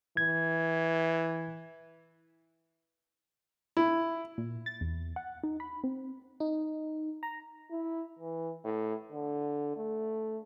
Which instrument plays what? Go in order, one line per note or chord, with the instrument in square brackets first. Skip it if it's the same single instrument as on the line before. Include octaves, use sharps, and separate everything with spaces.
[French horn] E3 [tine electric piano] G#6
[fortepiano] E4
[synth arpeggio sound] A#2
A6
E2
F#5
D#4
B5
C4
[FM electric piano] D#4
A#5
[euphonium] E4
E3
A2
D3
A3